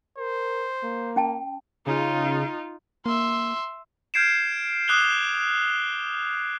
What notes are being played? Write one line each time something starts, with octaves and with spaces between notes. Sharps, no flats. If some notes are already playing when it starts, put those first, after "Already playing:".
A#4 C5
A#3
C#4 G5 A5
C#3 D#4 F4
A#3 E5 C6
F6 G6 G#6 C7 D7 E7
D6 D#6 F#6 F7 G7